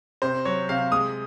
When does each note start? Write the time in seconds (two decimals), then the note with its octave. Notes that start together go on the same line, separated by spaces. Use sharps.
0.22 C3 C5
0.45 F#3 C#5
0.69 C3 F5
0.92 G#3 D#6